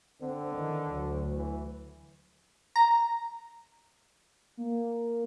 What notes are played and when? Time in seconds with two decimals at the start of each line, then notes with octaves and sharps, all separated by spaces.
0.21 D3 C4
0.53 D#3 E3
0.89 D2 F#3
1.35 E3
2.76 A#5
4.57 A#3